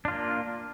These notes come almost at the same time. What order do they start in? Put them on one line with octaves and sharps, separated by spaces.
D4 F4 A#3